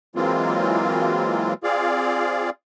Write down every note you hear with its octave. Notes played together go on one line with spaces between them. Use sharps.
E3 F#3 G#3 A#3 C4 F4
C4 F4 G#4 D5 F5